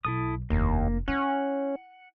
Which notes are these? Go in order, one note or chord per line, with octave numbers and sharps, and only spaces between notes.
B1 E4 A4 D#6
F1 D#2 A#3 D4
C#4 E4 F#5